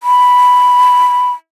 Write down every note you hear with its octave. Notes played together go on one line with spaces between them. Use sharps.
B5